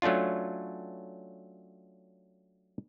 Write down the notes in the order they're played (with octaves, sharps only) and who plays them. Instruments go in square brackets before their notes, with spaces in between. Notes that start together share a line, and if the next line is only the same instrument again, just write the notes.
[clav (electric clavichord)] F#3 A3 C#4 D4 F4